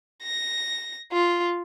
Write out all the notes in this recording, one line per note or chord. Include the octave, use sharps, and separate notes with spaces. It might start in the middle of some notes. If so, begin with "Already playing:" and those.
A#6
F4